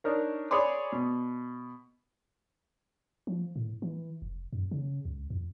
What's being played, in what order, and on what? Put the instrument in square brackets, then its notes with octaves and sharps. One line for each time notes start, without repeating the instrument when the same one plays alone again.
[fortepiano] D4 D#4 A#4 C#5
G#4 C#5 D5 B5 C6 D6
B2
[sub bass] F3
A2
E3
F1
F#2
C#3
C#2
F2